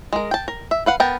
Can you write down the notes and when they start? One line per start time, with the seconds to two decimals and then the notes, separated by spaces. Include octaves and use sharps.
0.13 G#3 A#4
0.31 G5 A5
0.48 A#4
0.71 E5
0.86 B4 F5 F#5
1.00 B3 A#4 G5 A5